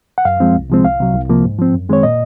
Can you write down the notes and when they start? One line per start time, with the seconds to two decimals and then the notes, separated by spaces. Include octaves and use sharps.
0.18 F#5
0.25 F#2 F5
0.40 F3 G#3 C4
0.56 C2
0.70 C3 F3 G#3 C4
0.85 C2 F5
1.00 C3 F#3
1.14 C2
1.29 C3 F3 A#3
1.44 G#2
1.59 F3 C4
1.74 F#2
1.89 D#3 G#3 C4 C#5
2.03 A#2 D#5